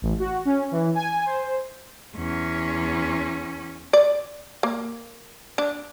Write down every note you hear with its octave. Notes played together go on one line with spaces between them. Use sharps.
A1
F#4
C#4
E3
G#5
C5
E2 C#4
D5
A#3
D4